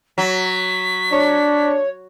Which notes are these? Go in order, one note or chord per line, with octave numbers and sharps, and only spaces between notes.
F#3 B6
D4 C#5